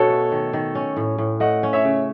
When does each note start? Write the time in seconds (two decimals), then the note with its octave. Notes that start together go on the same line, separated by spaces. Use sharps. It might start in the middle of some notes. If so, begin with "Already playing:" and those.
Already playing: B2 C#4 F#4 A4 C#5
0.10 A3
0.32 D#3
0.53 D#3
0.75 C#4
0.97 A2
1.18 A2
1.40 A3 D#5 F#5
1.63 C#4
1.73 C#5 E5
1.85 C#3